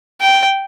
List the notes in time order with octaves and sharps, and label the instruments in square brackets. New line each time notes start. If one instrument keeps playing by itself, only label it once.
[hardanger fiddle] G5